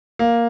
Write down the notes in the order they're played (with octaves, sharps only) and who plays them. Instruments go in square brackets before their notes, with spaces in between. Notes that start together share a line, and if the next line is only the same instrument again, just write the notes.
[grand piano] A#3